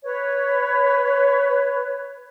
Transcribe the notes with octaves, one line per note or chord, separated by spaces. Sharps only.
B4 C#5